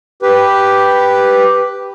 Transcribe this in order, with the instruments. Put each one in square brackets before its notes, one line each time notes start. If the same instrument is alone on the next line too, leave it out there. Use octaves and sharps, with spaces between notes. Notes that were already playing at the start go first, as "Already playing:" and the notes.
[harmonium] G4 B4